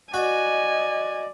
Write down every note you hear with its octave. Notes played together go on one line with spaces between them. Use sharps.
F#4 D5 D#5 G#5